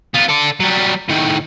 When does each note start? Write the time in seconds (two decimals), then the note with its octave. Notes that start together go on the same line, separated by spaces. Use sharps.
0.14 B3 F4
0.28 A4 D5
0.60 F#3 G3
1.09 A2 D#3